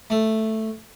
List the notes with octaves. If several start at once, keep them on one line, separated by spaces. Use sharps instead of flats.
A3